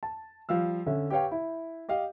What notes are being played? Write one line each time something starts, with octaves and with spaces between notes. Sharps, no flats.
A5
F3 G3 F5 E6
D3 C#4 E5
G4 B4 C#5 F5 G5
E4
G4 D#5 F5